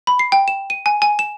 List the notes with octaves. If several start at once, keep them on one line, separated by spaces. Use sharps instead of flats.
B5
C7
G5
E7
D#7
G#5
G#5
E7